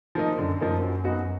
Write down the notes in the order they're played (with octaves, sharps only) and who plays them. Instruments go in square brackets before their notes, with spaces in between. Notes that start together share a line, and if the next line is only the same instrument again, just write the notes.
[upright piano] F3 A#3 D#4
[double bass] F#2 [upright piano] D3
[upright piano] F3 A#3 D#4
F#3
B3 D#4 F#4